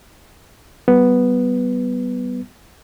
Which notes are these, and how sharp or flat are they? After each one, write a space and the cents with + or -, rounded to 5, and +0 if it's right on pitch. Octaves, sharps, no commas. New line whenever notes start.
G3 -35 B3 +0